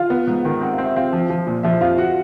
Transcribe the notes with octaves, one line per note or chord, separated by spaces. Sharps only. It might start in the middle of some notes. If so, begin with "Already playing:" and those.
Already playing: F4 F5
B3
G#2
D#3
C4 F#5
C4 F5
E5
C4 F4 F5
F3
F3
A#2
F3 E5
F2 F4 F5
F#4 F#5